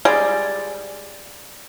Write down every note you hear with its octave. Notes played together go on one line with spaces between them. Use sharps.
G3 G#3 G#4 D5